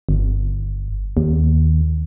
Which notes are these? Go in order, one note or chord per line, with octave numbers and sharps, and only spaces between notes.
G1
D#2